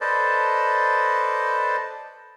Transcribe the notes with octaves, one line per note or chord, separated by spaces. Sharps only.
A4 B4 C5 D5 D#5 A5